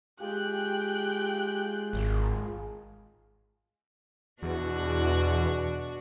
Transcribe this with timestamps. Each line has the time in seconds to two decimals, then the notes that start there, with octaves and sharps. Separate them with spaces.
0.20 G#3 F4 G4 G#4 G5 F#6
1.93 G#1
4.43 E2 B2 D4 F#4